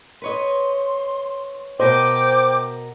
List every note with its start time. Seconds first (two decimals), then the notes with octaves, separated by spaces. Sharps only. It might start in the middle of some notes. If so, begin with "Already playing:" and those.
0.22 B4 C#5 D#5 C6
1.80 B2 A#4 C5 D#5 G5 D6